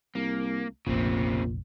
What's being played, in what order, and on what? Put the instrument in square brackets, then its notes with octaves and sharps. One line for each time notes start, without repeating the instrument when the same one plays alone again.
[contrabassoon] C2 [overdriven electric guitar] A#3
[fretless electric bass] F1 A#1 [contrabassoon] A#2 [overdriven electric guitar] C#3 C4